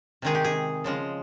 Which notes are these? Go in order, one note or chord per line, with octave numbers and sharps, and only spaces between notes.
C3 D#3 G#3 G#4
G4
G#4
C#3 F3 G#3